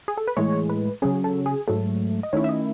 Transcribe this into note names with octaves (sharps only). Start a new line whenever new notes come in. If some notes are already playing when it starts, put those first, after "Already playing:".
G#4
A4
B4
A2 E3 G#3 C#5
B4
C#3 F#3 C#4 G#4
A4
G#4
G#2 F#3 A3 A4
D#5
D#3 A3 C#4 E4 C#5
E5
D#5